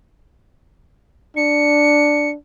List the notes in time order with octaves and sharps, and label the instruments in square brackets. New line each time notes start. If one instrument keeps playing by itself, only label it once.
[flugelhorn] D4 [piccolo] C#7